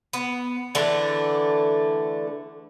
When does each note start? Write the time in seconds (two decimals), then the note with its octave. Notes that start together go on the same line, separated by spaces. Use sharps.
0.13 B3
0.75 D3 E3 A3 D4